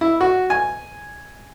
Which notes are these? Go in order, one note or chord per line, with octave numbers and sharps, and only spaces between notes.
E4
F#4
G#5